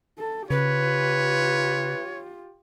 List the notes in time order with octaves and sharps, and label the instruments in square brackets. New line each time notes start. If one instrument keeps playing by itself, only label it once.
[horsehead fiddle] A4
[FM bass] C#3 [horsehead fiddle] F4 G4 [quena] B4 [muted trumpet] C#5